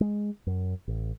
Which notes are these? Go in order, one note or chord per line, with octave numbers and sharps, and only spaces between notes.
G#3
F#2
A1